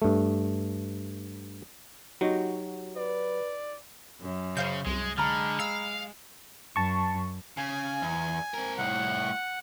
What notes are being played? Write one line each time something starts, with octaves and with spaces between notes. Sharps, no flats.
G2 A3
F#3 D#4 F#4 G4
B4 D5
F#2
C#3 C5 F5 G6
C2 G#3
D3 G#3 A#5 B5 F6
F5 E6
F#2 A5 C#6
C#3 G#5
E2
C4 A#4
C2 A2 F#5